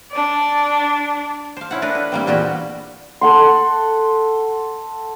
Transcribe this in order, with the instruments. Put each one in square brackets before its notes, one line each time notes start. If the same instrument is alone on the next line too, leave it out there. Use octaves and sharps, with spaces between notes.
[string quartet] D4 D5
[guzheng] C5 F5
C#4 E4 F#5
A3 D4 A#4 B4
B4
G3 A#3 C4
E2 A#2 F#4 G4 G5 B5
[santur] A4 F#5 C6